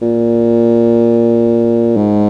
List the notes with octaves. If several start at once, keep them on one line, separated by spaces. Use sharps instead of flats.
A#2
G#2